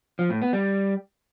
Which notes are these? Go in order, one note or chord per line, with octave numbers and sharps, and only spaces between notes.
F3
A2
B3
G3